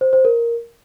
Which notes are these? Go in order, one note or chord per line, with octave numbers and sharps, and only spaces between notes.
C5
C5
A#4